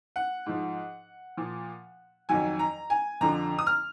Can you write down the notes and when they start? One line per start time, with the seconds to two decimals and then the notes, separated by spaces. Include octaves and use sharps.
0.16 F#5
0.46 G#2 F3
1.37 A#2 F3
2.29 F2 D#3 F#3 G#5
2.59 A#5
2.90 G#5
3.21 F2 D3 F3 A#5
3.59 D#6
3.67 F6